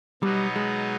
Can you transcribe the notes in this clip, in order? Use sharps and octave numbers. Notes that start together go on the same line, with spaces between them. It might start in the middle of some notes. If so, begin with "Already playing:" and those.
B2 F#3 G3 B3 D#4
G#3